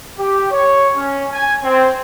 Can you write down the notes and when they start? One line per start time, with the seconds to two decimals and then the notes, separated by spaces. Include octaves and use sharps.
0.18 G4
0.51 C#5
0.97 C#4
1.31 G#5
1.64 C4